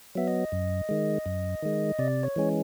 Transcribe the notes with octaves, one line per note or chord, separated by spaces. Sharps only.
F#3 B3 E5
D#5
F#2
D#3 G#3
F#2
D#3 G#3
C3 D5
C#5
E3 G#3 C#4